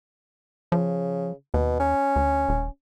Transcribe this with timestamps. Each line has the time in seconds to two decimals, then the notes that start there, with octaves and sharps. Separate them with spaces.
0.72 C#3 F3
1.54 D#2 B2
1.80 C#4
2.16 D2
2.49 D#1